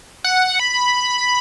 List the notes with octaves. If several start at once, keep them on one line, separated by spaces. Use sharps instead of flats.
F#5
B5